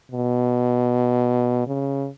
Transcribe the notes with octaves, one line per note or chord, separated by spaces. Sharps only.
B2
C#3